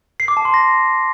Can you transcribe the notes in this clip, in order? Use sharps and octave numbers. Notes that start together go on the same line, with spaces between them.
C7
D6
A5
C6
A#6